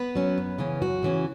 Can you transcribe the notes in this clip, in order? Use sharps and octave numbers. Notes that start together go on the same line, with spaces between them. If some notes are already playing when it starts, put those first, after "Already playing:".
Already playing: B3 B4
F#3 C#4
F#2
C#3 E3 C#4
F#2 F#4
C#3 E3 C#4